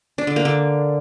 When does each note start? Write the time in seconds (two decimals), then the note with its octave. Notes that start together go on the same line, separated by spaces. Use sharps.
0.18 D4
0.27 D3
0.36 A#3
0.45 D3